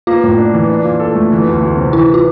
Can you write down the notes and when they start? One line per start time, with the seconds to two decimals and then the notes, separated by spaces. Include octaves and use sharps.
0.07 A#3 F4
0.23 A2
0.38 D4
0.54 E3
0.70 D4
0.84 A#2
1.00 A4
1.15 A3
1.32 E3
1.47 D2
1.62 D2
1.77 C3
1.93 E3 E4
2.14 F4